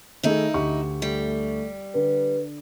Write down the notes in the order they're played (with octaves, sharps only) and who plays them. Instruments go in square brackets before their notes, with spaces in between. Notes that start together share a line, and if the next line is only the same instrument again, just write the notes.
[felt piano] D#3 A3 G#4 [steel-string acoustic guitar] D#4 E4
[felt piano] D2 G4 C#6
[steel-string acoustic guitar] G3 [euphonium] A3
[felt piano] D3 [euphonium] B4